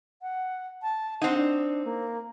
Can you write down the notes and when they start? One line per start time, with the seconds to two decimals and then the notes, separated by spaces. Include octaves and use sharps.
0.22 F#5
0.82 A5
1.21 C4 D#4 F#5
1.37 D4
1.85 A#3